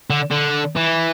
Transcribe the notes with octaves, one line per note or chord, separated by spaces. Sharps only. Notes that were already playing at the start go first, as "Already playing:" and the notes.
D3
D3
E3